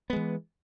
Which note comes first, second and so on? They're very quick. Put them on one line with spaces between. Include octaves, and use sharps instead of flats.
B3 G#3 E3